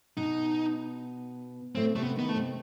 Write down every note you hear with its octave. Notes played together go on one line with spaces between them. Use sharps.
B2 B3 D#4
A2 A3 C4
C3 A3 C4
B3
D#3 B3 D#4
A3
C3 C4